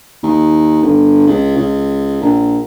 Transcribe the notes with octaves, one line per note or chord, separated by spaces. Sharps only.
D#2
G1
C#2
C#2
A#1